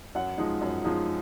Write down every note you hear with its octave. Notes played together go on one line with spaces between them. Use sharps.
F#2 F#5
F3 G#3 D#4
F#2
F3 G#3 D#4